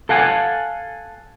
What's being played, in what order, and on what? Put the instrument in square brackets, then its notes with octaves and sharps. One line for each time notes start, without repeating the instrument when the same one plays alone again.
[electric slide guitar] A4 F5 F#5 G#5